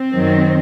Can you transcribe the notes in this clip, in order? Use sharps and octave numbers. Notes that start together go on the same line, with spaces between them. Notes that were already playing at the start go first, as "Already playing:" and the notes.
Already playing: C4
F#2 D#3 F#3